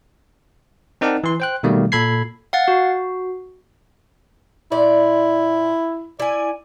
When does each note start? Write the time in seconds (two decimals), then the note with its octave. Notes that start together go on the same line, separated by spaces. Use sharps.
1.01 C4 D#4 A#4 D5 F#5 A5
1.24 E3 C6
1.40 C5 G5 F#6
1.63 B2 D#3 G3 A3 A#3
1.92 A#2 A4 B5 G#6 C7
2.53 F5 F#5 A6
2.68 F#4
4.72 A#2 E4 D5
6.20 E4 D5 G#5